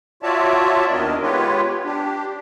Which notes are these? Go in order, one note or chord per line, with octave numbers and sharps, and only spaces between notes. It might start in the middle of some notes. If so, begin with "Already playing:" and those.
F4 F#4 C#5 D5 E5 A5
D#2 D#3 B3 D4 A#4 D#5
G#3 B3 F4 G4 B4 C#5
D4 G4